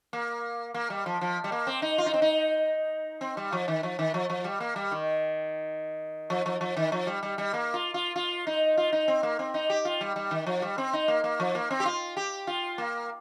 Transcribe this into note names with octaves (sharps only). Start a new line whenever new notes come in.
A#3
A#3
G3
F3
F3
G3
A#3
C4
D#4
F4
D#4
C4
D#4
C4
G3
F3
D#3
F3
D#3
F3
F3
G3
A#3
G3
D#3
F3
F3
F3
D#3
F3
G3
G3
G3
A#3
F4
F4
F4
D#4
F4
D#4
C4
A#3
C4
D#4
G4
F4
G3
G3
D#3
F3
G3
C4
D#4
A#3
A#3
F3
A#3
C4
G4
F4
G4
F4
A#3